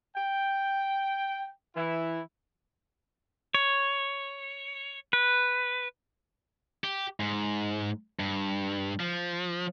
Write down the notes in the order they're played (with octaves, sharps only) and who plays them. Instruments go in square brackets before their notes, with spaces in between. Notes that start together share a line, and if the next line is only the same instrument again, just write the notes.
[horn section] G5
E3 E4
[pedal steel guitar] C#5
B4
[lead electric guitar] G4
G#2
G2
F3